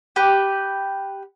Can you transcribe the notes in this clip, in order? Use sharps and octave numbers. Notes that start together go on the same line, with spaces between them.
G4 B4